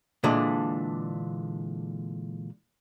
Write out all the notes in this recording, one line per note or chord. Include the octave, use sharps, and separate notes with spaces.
A#2 D3 E3 G#3 D4